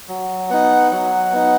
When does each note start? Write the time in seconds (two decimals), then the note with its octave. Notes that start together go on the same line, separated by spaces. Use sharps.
0.09 F#3
0.50 B3 D#4 F#5
0.91 F#3 F#5
1.33 B3 D#4